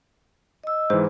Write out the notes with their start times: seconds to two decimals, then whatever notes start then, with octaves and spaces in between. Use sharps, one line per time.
0.64 D#5 E6
0.90 G#2 E3 C5